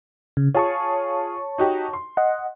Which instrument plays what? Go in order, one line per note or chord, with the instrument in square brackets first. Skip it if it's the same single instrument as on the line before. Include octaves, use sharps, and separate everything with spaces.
[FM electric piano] C#3
[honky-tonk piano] F4 G#4 [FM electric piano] C#5 A5 C#6
[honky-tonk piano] D#4 F#4 G4
C6
[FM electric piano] D#5 F#5